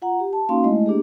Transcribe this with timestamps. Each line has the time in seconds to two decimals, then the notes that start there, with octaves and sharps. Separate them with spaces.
0.02 F4 F#5 A#5
0.20 G4
0.33 A5
0.49 A#3 C#4 D#4 F#4 F5 C6
0.64 G#3 A3 E4 D#5
0.86 A#3 D4 G4 G#4